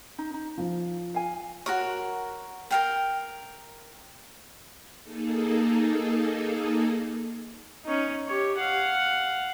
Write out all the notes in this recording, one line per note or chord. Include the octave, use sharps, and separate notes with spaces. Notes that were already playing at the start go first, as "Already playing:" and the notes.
D#4
D#4
F3
F5 G#5
F#4 A#4 C#5
A#4 F5 G5
A#3 D#4 G#4 A4
C#4 D#4
G4 C#5
F5 F#5